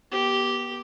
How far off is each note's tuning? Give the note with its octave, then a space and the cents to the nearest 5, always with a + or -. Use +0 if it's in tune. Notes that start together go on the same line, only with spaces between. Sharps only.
B3 -35 G4 -10